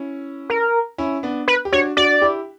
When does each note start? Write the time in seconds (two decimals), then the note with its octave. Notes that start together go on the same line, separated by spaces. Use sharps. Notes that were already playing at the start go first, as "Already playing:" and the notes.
Already playing: C#4 E4
0.50 A#4
0.98 C#4 E4
1.23 B3 D4
1.48 B4
1.65 G4
1.72 D4 F#4 C#5
1.97 D4 F#4 D5
2.21 E4 G4